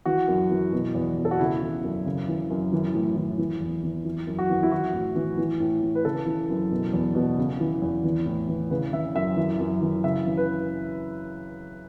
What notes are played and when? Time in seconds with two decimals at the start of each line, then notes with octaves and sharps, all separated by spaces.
0.05 E3 F#4
0.28 F#2
0.50 E3
0.72 B2
0.95 E2
1.18 B2
1.25 A4
1.31 F#4
1.39 C#3 E4
1.62 E3
1.84 F#2
2.05 C#3
2.28 E3
2.50 F#2
2.72 E3
2.94 A2
3.16 E3
3.38 E3
3.60 E2
3.83 E3
4.05 E3
4.27 F#2
4.39 F#4
4.50 E3
4.63 E4
4.72 E3 F#4
4.93 A2
5.16 E3
5.38 E3
5.60 A2
5.82 E3
5.95 B4
6.05 C#3 A4
6.26 E3
6.50 F#2
6.71 B2
6.93 E2
7.15 B2
7.38 C#3
7.60 E3
7.82 E2
8.04 E3
8.26 A2
8.48 E3
8.70 C#3 B4
8.92 E3 E5
9.15 F#2 E5
9.37 E3
9.59 F#2
9.81 E3
10.04 C#3 E5
10.26 E3
10.37 B4